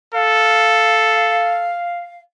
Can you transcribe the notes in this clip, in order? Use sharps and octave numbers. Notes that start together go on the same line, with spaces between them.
A4 F5